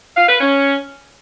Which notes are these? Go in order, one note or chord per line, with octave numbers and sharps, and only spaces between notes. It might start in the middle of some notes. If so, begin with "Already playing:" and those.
F5
B4
C#4